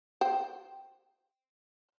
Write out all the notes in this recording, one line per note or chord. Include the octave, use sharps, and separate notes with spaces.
C5 G5